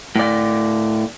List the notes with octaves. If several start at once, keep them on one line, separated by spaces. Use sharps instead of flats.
A2 D5